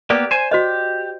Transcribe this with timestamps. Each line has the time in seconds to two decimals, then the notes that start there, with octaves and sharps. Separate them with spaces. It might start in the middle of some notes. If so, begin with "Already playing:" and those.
0.10 A#3 B3 G4 D5
0.31 C5 G#5
0.51 F#4 G4 C5 D#5